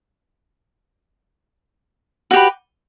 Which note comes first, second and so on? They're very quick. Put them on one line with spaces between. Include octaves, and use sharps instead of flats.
F#4 G4 B4